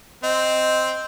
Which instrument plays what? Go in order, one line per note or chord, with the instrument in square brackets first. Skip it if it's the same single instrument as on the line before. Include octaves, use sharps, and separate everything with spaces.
[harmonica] C4 [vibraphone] D#5